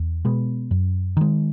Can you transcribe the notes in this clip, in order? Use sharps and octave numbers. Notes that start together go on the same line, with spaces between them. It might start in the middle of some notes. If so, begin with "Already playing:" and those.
Already playing: E2
B2 G#3 B3
F#2
D#3 G#3